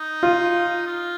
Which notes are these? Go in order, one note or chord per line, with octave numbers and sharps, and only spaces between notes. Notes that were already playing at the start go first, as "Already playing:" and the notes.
Already playing: D#4
F4
F4